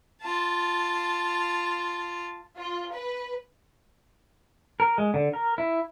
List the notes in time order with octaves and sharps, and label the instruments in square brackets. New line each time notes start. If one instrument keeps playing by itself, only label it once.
[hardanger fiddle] F4 A5
[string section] F4
B4
[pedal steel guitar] A#4
G#3
D3
A#4
E4